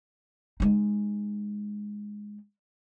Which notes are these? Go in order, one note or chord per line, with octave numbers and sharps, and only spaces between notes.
G#3 D#4